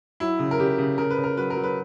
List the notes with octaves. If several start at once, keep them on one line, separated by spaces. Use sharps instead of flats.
F#3 E4
C#3
A#4
C#3 G4
C#3
C#3 A#4
B4
C#3
A#4
F#3 B4
A#4
F#3
B4